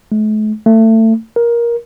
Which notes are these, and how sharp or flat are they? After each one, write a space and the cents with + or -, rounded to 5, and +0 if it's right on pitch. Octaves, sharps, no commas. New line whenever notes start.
A3 -45
A3 +25
A#4 +15